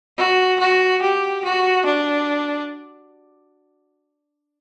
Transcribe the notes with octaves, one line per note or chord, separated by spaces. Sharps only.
F#4
F#4
G4
F#4
D4